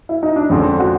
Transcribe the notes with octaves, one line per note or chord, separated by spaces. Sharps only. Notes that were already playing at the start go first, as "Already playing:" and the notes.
E4
D#4
D4
F2 D3 F3 G#3 C4 C#4
F#4